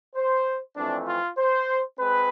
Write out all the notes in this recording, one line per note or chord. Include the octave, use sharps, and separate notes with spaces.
C5
F2 E3 A3 C4 D4
F4
C5
G#3 C4 B4